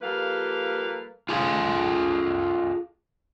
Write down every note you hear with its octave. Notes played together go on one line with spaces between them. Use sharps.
F3 G3 A#3 A4 B4 F5
F4 G#4 A4 F5